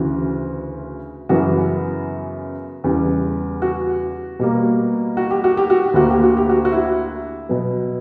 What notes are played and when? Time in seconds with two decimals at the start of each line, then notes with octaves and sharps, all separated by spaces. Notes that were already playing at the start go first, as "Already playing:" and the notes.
Already playing: D2 C#3 E3 F#4
1.29 F#2 C#3 E3 B3 F#4
2.84 E2 C#3 G3
3.62 F#4
4.39 B2 G3 A#3
5.17 F#4
5.31 G4
5.44 F#4
5.57 G4
5.70 F#4
5.84 G4
5.94 D2 D3 A#3 F#4
6.10 G4
6.24 F#4
6.37 G4
6.49 F#4
6.65 F#4
6.72 E4
7.49 B2 F#3 B3